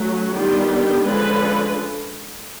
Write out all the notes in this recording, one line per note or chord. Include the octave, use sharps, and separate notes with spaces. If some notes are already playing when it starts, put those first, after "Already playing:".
Already playing: F#3 A3 C#4
D#3 G3 B3 D4 F4 G4
G4 A4
D3 F3 G#3 C#4 A4 B4